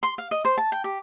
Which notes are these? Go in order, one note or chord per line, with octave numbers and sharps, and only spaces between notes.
C6
F5
D#5
C5
A5
G5
G4